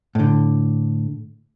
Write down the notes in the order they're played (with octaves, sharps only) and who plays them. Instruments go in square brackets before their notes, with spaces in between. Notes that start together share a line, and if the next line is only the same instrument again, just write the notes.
[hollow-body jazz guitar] A2 D3